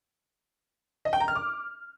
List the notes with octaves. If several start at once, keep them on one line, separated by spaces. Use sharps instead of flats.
D#5
G5
A#5
F6
D6